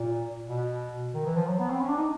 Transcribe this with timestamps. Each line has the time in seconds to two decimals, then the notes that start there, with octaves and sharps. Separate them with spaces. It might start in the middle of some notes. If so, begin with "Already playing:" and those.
Already playing: A#2
0.48 B2
1.14 D#3
1.26 E3
1.36 F3
1.47 F#3
1.59 B3
1.70 C4
1.81 C#4
1.89 D4
1.97 D#4